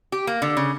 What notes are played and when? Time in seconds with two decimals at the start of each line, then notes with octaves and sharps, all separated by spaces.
0.12 G4
0.27 A#3
0.42 D3
0.57 C#3